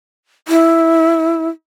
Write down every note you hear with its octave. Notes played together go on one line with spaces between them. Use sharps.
E4